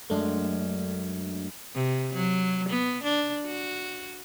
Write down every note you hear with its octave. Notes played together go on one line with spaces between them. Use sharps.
F#2 G#3 A3 D4
C3
F#3
B3
D4
F#4